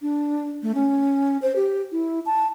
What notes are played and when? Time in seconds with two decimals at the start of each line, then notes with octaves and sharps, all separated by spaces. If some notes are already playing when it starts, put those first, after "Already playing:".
0.02 D4
0.63 A3
0.75 C#4
1.42 C5
1.56 G4
1.92 E4
2.26 A5